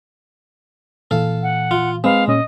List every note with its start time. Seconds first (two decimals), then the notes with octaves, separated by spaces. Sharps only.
1.11 A#2 E3 A4 F5
1.43 F#5
1.71 F4
2.04 G#3 C4 B4 F5
2.28 A#2 C#4 D#5